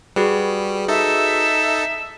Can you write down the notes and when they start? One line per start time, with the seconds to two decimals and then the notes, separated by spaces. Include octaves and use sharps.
0.16 G3 F#4 G#4 B4
0.88 D#4 A4 E5